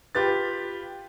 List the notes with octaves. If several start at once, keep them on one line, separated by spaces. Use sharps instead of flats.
F4 G4 B4 A6